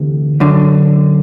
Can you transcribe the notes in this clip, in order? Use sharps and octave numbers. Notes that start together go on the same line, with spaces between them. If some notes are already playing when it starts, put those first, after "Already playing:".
Already playing: D2 C3 E3
F#2 D3